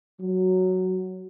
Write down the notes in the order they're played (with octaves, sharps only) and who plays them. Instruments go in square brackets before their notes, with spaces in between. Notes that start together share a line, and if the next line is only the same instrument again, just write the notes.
[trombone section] F#3